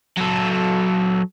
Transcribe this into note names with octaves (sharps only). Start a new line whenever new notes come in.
F#3 A4